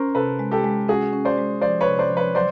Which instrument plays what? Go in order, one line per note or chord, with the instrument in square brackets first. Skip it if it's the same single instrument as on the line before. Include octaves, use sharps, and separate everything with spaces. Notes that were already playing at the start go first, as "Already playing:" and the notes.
Already playing: [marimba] C#4 [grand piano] A#4 C5
[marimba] C3 [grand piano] A4 B4
[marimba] G#3
[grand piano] G4 A4
[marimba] G#3
[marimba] C#4 [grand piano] F#4 G#4
[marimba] C#4
[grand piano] C5 D5
[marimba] G#3
[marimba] F3 [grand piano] C5 D5
[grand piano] B4 C#5
[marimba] C3
[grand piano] C5 D5
[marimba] F3
[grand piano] B4 C#5
[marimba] F#3 [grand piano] C5 D5